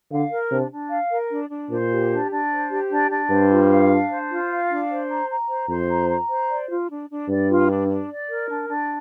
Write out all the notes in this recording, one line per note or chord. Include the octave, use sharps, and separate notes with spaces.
D3 F5
A#4
C3 D4
D4
F5
A#4
D4
D4
A#2 C5
G4
D4
D4
C5
G4
D4
D4
G2 C5
F4
F5
D4
C5
F4
F5
D4
C5
A#5
A#5
C5
F2 C5
A#5
A#5
C5
D5
F4
D4
D4
G2 D5
F4
D4
D4
D5
A#4
D4
D4